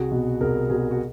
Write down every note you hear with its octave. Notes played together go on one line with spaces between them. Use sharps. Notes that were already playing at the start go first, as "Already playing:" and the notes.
Already playing: C2 F#4 G#4
B2
C2 G#4 A#4
B2 F#4 G#4
F#4